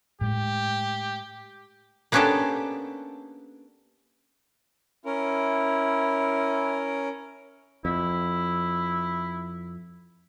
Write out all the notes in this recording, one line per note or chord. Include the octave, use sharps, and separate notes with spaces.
A2 G#3 G4
A#3 B3 C#4 D4 G4 A4
C#4 E4 A#4
F2 E4